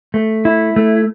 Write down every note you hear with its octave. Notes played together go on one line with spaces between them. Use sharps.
A3
E4
A3